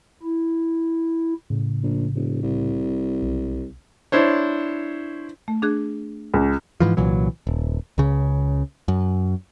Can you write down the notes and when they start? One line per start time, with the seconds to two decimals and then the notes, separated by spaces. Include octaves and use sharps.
0.23 E4
1.50 A2 C#3
1.82 A#1
2.15 E1
2.43 C2
3.22 B1
4.12 D4 E4 C5 C#5
5.48 A3
5.62 D4 G#4 F#6
6.34 C#2
6.80 G#2 E3 F3
6.97 C2 A#2 E3 F#3
7.47 D#1
7.98 C#2 C#3
8.88 F#2